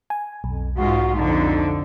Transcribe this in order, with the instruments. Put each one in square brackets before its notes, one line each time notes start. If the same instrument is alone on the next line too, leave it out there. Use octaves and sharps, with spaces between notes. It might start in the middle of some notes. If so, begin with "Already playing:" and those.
[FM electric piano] G#5
[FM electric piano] B1 [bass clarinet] F2
[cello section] G#2 G#3 F4 [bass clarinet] F#4
[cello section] F2 D3 [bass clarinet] D#4